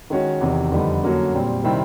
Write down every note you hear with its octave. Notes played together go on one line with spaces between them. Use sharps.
D#3 G#3 C#4 F#4
E2 C3 D#3
F2 D3 G3 B3 D#4
D3 F#3 A#3 C#4 F#4
A#2 G3 C4
C3 D#3 G3 C4 E4